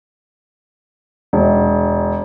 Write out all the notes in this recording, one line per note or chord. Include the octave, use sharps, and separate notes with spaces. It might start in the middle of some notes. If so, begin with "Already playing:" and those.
E1